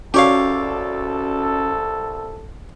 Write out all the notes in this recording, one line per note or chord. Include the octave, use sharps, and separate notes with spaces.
C2 C#4 F#4 G4 A4 C#5 D5 F5